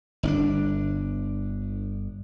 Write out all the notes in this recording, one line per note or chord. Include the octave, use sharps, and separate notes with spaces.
G1 C#4 D4